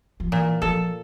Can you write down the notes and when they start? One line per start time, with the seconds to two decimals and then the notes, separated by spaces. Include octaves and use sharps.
0.20 F3
0.32 A#2 E3
0.62 F3 A4